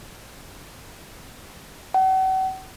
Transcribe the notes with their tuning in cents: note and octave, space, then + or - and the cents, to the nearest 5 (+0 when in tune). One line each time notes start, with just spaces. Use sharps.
F#5 +40